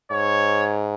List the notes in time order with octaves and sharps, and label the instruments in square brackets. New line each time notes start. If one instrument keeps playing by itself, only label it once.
[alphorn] G#2 [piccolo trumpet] C#5